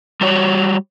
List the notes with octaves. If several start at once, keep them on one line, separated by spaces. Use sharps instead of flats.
G3 F#4 C#5